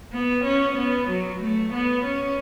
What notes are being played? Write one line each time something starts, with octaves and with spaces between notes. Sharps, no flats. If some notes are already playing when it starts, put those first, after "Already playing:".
B3
C#4
B3
F#3
A3
B3
C#4